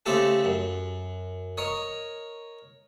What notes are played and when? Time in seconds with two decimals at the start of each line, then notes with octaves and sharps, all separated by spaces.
0.06 C#3 A3 C4 G4 A4
0.44 F#2
1.57 A#4 C#5 D#5